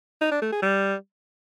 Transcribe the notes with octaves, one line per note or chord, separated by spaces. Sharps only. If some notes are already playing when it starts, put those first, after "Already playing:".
D#4
D4
A3
G#4
G3